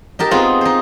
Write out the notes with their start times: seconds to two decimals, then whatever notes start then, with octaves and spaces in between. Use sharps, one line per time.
0.19 D#4 G4 A#4 A5
0.31 B3 C4 D#4 F4 G#4
0.61 D#4 C5